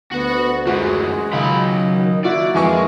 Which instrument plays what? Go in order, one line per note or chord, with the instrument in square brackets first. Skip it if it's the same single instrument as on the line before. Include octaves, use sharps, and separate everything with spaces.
[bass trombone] D2 [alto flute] B3 [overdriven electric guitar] F#4 F#5
[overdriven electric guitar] F#2 E3 [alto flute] G#3 [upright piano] F#4
[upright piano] C#2 [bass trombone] D#3 [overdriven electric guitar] F#3 B5 [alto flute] D#5
[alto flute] A#3 [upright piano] E4 F#4 [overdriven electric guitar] D5
[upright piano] F2 G#5 C#6 [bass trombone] E3 [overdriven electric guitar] G#3